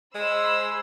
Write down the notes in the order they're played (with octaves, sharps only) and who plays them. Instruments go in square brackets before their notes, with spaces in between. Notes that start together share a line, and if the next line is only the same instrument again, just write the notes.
[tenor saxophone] G#3 [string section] C5 B5 E6